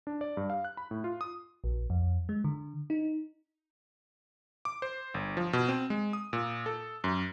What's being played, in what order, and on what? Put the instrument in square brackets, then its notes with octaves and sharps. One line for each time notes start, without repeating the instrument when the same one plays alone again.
[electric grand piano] D4
D5
G2
F5
F#6
B5
A2
F4
D#6
[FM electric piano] A#1
F2
G#3
D3
D#4
[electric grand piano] D6
C5
G1
F3
B2
C4
G#3
D#6
A#2
A4
F#2